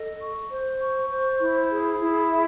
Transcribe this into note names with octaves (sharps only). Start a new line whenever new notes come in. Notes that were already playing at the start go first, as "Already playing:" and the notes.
Already playing: A4 D#5
C#6
C5
C#6
C5
E4
G#4
E4
E5